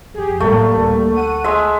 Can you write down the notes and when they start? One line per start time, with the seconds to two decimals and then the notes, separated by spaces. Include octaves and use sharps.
0.14 F2 G4 G#4
0.40 A2 F#3 G3 A3 A#3
0.72 D2 D3
1.16 F#5 D#7
1.44 G#3 E5